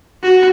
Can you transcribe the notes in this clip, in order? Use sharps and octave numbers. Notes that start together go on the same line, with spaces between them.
F#4